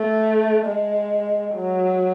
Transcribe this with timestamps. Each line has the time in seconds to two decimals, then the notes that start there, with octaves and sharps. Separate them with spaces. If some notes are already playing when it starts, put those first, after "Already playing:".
Already playing: A3
0.66 G#3
1.55 F#3